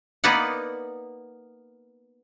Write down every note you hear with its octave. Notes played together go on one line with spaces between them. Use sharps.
A#3 B3 D#4 B4 D5 F#5